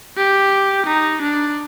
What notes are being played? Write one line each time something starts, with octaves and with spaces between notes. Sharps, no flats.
G4
D#4
D4